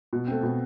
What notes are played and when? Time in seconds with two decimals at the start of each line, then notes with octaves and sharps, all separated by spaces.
0.13 B2
0.27 A3 C4
0.43 B2